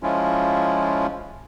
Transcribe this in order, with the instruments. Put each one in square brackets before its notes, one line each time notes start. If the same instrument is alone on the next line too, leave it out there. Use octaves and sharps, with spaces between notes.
[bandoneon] F3 G#3 C#4 E4 F4